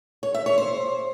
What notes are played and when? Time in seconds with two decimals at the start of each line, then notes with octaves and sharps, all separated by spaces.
0.23 C#5
0.34 E5
0.46 C#5
0.58 C5